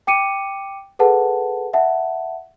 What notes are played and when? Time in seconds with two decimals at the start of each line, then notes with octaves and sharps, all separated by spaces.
0.07 G5 D6 C#7 D#7
0.99 G#4 A4 B4 F#5 A5
1.73 E5 F#5 A5